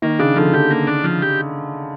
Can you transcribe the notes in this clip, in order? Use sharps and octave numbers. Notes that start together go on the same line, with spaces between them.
D#3 A#3
C#3 D4
D3 F3
D3 G4
A#3
D4
F3
G4